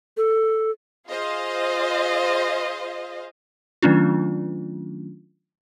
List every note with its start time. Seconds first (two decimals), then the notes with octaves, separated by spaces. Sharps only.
0.17 A4
1.08 F4 G#4 C5 D#5 F5
3.83 D#3 F#3 A3 C#4 D4 F4